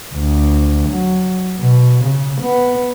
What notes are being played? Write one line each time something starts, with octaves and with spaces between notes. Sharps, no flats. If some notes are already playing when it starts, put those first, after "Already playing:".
D2
F#3
B2
C#3
B3